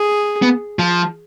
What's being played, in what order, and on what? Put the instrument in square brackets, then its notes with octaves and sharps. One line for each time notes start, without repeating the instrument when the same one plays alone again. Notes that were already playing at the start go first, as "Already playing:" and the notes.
Already playing: [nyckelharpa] G#4
[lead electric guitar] B3
F3